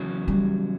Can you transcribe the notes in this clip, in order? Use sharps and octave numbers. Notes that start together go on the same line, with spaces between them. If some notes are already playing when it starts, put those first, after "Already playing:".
Already playing: E2 C#3 F#3
G3